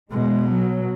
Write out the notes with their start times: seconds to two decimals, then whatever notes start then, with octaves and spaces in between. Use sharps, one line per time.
0.11 B2 G#3
0.48 F#3